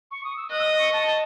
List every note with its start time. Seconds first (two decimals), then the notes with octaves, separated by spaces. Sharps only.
0.11 C#6
0.24 D#6
0.37 E6
0.50 D#5 F#6
0.60 E6
0.64 D#6
0.78 C#6
0.93 A5
1.07 A5